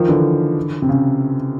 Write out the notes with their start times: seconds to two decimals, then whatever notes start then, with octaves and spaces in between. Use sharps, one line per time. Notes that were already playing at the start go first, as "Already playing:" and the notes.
Already playing: D#3 F3
0.09 D3 E3
0.82 C3
0.89 C#3